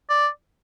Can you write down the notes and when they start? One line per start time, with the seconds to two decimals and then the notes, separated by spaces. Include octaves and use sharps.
0.09 D5